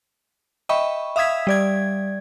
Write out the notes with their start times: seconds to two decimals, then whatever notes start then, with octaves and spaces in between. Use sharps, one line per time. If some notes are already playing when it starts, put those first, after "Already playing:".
0.69 D#5 E5 G5 B5 C#6
1.16 E5 F5 D#6 E6 G#6 B6
1.47 G3 D5 G#6